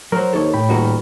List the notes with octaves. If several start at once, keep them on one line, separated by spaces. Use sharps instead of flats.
F#3 A#4 C5
D#2 A4 C#5
A2 G5 B5
D#1 D#4 F#4 A#4